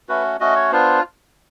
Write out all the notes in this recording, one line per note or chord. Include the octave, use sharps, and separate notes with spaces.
A3 C#4 F#4 B4
A3 C#4 F#4 D#5
C#5
B3 D4 F4 C5